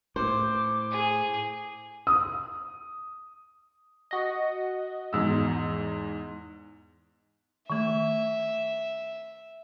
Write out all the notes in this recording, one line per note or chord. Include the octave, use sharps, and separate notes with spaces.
A2 C5 D6
G#4
D#6
F#4 D#5
E2 G#2 E6
D#3 A3 E5